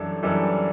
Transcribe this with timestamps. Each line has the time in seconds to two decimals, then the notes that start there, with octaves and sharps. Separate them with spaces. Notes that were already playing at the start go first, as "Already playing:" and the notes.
Already playing: F#2 E3 G3 D4 A4
0.23 F#2 E3 G3 D4 A4